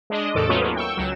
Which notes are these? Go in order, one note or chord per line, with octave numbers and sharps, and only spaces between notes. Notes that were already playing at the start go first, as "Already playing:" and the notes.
G#3 D4 D#5
D#2 G#2 C3 A4 A6 D7
F#3 A3 B3 C#4 D#4 F4
A#3 B3
G5 C#6 E6
C#2 F#3 E7